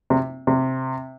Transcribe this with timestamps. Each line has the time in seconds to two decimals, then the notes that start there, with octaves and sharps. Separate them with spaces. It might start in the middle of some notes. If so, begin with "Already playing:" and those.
0.10 C3
0.47 C3